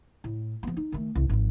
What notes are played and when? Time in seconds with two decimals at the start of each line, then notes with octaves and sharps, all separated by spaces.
0.24 A2
0.63 F3 B3
0.77 D#4
0.92 D#3 A3
1.15 C2
1.30 G#1 F3